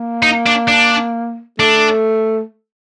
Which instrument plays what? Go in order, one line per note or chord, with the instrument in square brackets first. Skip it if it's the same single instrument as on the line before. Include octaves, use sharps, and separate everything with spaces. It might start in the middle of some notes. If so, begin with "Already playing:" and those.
Already playing: [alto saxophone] A#3
[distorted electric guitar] D#4
D4
D4
[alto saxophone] A3 [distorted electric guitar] D4